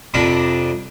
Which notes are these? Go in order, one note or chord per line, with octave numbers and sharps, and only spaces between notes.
F2 C3 D4 A#4 B5 D#6